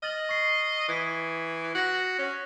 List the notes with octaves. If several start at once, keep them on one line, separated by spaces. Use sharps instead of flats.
D#5 F6 A6 F#7
C#6 C7
E3 D#6 G#6 B6
F#4 F#6 A#6
C#4